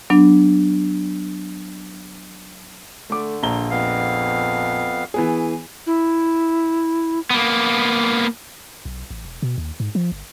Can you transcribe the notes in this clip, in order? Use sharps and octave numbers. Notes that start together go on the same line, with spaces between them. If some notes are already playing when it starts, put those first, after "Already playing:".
F#3 B3 D4
D3 A3 D6
A#1 A#5 G7
F2 B3 F5
E3 B3 G#4
E4
A#3 B3
B1
A1
E1
B2
D#2
G#2
F3
G1